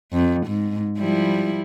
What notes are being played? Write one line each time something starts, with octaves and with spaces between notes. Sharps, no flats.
F2
G#2
F3 G3 E4